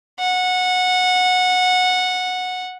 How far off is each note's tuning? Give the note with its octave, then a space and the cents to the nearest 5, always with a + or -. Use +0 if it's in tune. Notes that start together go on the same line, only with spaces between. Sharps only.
F#5 -15